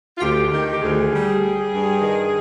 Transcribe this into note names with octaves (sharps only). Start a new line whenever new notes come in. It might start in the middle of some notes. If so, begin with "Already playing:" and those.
F4
D2 G4
D#3 G4
G4
D2 G#4
G3
G3
G2
D#3